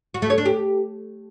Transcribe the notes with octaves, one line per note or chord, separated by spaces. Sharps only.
F#4
A3
C#5
D4
G4